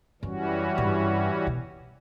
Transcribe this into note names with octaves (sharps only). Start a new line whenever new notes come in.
F#2 E3 G3 C#4 F#4
A#2
G2
B2